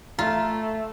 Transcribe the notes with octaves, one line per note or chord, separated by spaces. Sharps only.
A3 F4 A#5